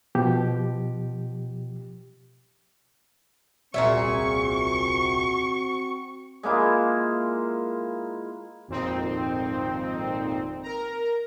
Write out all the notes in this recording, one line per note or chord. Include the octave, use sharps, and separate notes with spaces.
B2 F3 G4
D#1 C2 A#2 C4 F#4 G#4 E5 C#6
G#3 A#3 E4 F4
G#1 F2 A#2 C4 D#4
A#4 A#5